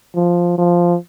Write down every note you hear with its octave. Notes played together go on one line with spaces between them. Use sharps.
F3
F3